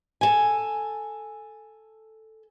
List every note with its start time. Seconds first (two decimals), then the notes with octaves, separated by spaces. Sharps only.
0.21 A4 G#5